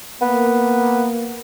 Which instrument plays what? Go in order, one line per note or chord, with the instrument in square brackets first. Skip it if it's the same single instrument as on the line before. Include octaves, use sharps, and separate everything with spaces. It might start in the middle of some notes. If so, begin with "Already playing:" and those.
[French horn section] A#3 [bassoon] B3